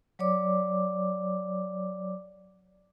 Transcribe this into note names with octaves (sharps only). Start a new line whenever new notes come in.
F#3 C#5 D5 D6